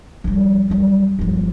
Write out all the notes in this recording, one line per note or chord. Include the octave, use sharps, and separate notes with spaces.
F3 G3
F#3 G3
G1 F3